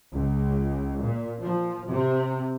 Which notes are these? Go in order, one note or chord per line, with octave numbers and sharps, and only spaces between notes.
C#2
A#2
F3
C3